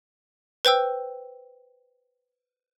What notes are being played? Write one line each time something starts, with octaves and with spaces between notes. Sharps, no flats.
B4 C5 G5 E6